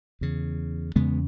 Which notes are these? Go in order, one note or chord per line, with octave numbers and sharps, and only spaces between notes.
E2 C#3
E2 C#3 G#3 B3